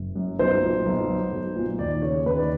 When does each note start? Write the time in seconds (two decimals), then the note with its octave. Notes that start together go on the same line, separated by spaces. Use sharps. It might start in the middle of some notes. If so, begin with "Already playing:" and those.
Already playing: F#1
0.16 F#2
0.39 B1 C5
0.62 A#2
0.86 B1
1.09 F#3
1.32 B1
1.56 A#2
1.79 D#2 D5
2.02 C#3 C#5
2.25 D#2 B4
2.38 D5